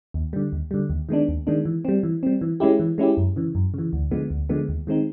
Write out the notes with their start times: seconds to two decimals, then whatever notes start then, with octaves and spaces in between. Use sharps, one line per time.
0.14 D#2
0.33 D3 G3
0.52 D#2
0.71 D3 G3
0.90 D#2
1.09 D#3 G#3 B3 D4
1.28 D#2
1.47 D#3 G#3 B3 D4
1.65 E3
1.85 G3 C4
2.03 E3
2.23 G3 C4
2.41 E3
2.60 G#3 C#4 E4 G4
2.80 E3
2.98 G#3 C#4 E4 G4
3.17 F#2
3.36 C#3 E3
3.55 F#2
3.74 C#3 E3
3.93 D2
4.11 D3 F3 G#3 B3
4.30 D2
4.49 D3 F3 G#3 B3
4.69 D#2
4.87 D#3 G#3 C4 D#4